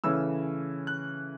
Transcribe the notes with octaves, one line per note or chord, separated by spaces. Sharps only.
C#3 E3 A3 C#4 E6
F#6